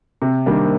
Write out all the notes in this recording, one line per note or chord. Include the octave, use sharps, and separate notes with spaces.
C3
D#3 G3 A#3 D4